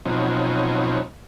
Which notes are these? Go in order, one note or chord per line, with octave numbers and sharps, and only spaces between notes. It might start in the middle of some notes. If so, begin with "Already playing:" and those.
B2 F3 F#3 C4 C#4 D#4